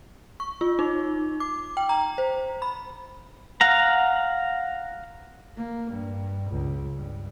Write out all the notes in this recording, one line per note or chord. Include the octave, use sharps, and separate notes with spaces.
C#6
F4
D#4
D6
G5
A#5
C5
B5
F5 F#5 A#5
A#3
G2
C#2
G2